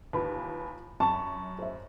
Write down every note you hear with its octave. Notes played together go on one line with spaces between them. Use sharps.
D#2 E3 F3 B4 B5
F#2 A5 B5 C#6
C5 E5